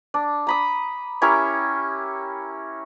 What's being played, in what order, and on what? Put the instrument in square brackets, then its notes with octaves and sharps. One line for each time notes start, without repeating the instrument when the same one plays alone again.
[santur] D4
A#5 B5 D#6
C#4 E4 G4 A#4